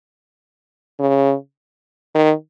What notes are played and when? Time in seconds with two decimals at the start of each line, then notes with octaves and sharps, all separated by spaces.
0.99 C#3
2.15 D#3